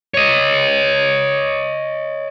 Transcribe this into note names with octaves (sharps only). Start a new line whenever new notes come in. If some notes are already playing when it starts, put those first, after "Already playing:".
C#5 D#5